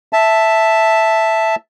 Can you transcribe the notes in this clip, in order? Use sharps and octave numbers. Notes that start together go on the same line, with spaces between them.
E5 A5